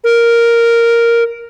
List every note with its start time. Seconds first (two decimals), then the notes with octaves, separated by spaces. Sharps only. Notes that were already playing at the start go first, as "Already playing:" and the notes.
0.04 A#4